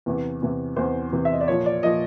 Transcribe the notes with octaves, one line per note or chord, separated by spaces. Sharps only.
E2 C3 E3
E2 C3 E3
E2 C3 E3 C5
E2 C3 E3
E5
D#5
D5
A#2 F3 C#5
D5
A#2 F3 D#5